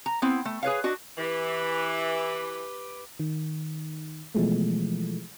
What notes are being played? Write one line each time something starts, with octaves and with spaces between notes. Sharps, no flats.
A#5
B3 C4 E4
A3
G#4 B4 C#5 F5
D4 F#4 D#5
E3 G4 B4
D#3
B2 E3 F3 G#3 A3